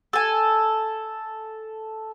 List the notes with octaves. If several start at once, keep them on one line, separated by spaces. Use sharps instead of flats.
A4 G#5